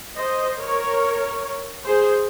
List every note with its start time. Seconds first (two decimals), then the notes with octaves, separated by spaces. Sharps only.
0.16 C5 D#5
0.59 A#4 C#5
1.86 G#4 C5